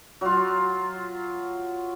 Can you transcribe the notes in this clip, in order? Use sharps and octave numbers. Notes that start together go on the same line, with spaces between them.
F#3 F4